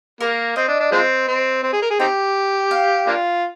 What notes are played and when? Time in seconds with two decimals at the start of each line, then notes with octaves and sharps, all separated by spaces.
0.20 A#3 A#4
0.56 C4 D#5
0.68 D4
0.80 D4
0.92 F3 G#3 C4
1.28 C4
1.63 C4
1.73 G#4
1.82 A#4
1.90 G#4
2.00 C4 D#4 G4 G5
2.71 F5
3.07 A#3 D4 F4